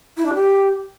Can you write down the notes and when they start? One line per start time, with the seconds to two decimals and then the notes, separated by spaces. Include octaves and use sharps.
0.17 E4
0.25 D4
0.34 G4